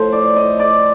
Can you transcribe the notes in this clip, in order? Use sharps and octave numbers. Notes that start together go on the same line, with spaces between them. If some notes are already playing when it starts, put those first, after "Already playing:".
Already playing: A2 F3 C5
D5
D#5
D5